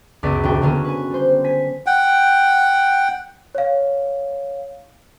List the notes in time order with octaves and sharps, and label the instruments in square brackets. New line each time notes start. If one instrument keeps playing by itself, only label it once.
[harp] C#2 F#2 B3 D5 F#5 B6
D#1 F#3 D4 F#4 G5
D3 F#3 A#3 B3 C#4
B4 G#5
G3 C5
G#5 B6
[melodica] F#5 G5
[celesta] C#5 F5